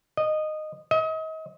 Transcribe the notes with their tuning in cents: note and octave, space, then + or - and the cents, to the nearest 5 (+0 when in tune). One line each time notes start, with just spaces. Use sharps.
D#5 -15
D#5 +35